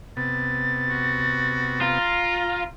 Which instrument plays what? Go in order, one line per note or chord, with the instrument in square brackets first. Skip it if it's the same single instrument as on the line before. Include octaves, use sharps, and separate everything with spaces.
[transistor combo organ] C3 B3 [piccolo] A6
[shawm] F#4
[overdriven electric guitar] F4 [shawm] A#5